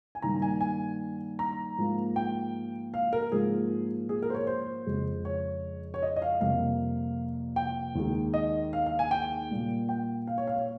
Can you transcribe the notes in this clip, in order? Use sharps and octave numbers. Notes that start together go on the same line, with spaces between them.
G#5
G2 D#3 G3 A#3 A#5
G#5
G#5
A#5
G#2 F3 A#3
G5
F5
A#4
G#2 F3 A#3 G#4
G#4
A#4
C5
C#5
C5
F2 C#3 G#3
C#5
C#5
D#5
D#5
F5
F2 C3 G3 A#3 F5
G5
D#2 D#3 G#3
D#5
F5
F5
G#5
G5
A#2 G3 A#3
G5
F5
C#5
F5
C#5